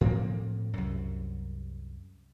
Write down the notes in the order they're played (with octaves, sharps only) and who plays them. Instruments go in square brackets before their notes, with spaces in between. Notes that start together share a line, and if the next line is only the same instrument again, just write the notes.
[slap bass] A2 F3 A#3 C4
C2 F#2